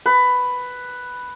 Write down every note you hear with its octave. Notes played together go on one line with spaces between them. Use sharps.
B4